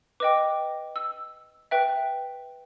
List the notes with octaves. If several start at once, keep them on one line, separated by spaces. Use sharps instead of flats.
B4 D#5 G5 D6
E6
B4 E5 G5